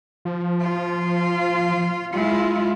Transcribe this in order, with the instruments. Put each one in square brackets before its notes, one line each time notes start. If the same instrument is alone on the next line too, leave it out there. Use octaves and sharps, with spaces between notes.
[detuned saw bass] F3
[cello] F4
[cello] G#3 E4 [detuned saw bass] F4